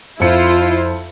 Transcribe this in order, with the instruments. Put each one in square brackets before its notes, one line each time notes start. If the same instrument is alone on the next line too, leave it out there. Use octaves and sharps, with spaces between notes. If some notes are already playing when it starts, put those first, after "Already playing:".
[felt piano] F2 F3 C#7 [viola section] E4 F4 C5